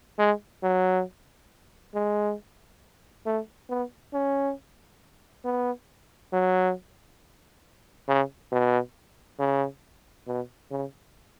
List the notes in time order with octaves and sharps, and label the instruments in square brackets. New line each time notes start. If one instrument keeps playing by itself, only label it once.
[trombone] G#3
F#3
G#3
A3
B3
C#4
B3
F#3
C#3
B2
C#3
B2
C#3